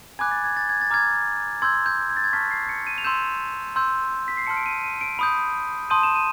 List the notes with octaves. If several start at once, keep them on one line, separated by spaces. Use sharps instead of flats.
G#5 B5 D6 F#6 G#6
A6
G#6
A6
G#6
A6
A#5 D6 F6 G#6
C6 E6 G6 G#6
G6
G#6
A6
G#6
A5 C#6 F6 B6
C7
C#7
D#7
F7
C6 E6 G6 E7
C6 E6 G6
B6
C7
A5 C6 F6 C#7
D7
D#7
D#7
D7
B5 D#6 G6
A5 C6 D#6 G6 D#7
E7
D#7